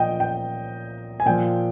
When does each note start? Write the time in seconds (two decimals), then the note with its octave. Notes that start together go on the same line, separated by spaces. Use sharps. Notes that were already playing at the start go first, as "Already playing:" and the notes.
Already playing: A#2 F3 D#5 G5
0.20 G5
1.20 G#5
1.26 A#2 F3 G5